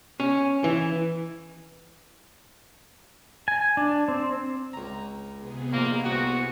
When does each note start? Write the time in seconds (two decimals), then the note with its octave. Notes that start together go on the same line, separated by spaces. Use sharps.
0.20 C#4
0.64 E3
3.48 G#5
3.77 D4
4.08 C4
4.73 C#2 A#5
5.36 C3 B3 G#4
5.73 A#1 A#3 D#4 D#5
6.04 C2 F#4 G5 D#6